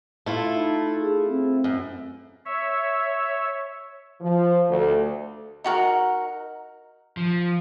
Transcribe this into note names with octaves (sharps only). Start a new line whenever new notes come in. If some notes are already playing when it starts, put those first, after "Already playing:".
A3 E4 F4
D#4
G#4
C4
F#2
C#5 E5
F3
D2
D#4 F#4 G4 A#4
F3